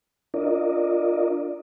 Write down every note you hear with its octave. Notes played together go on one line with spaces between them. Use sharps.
D4 F4 A#4 D5 D#5